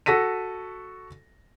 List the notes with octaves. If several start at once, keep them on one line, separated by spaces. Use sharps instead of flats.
F#4 A4 A#6 B6 D#7